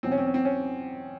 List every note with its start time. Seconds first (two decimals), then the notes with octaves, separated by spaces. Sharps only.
0.03 E2 B2 F#3 C4
0.11 C#4
0.18 C4
0.26 C#4
0.34 C4
0.45 C#4